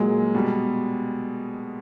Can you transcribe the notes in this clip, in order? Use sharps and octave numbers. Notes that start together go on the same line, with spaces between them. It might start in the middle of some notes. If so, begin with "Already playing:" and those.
Already playing: A#2 F#3 G#3
B2 G3